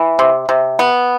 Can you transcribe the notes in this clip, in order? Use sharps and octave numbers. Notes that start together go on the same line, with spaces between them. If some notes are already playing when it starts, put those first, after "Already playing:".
Already playing: E3
C3
C3
B3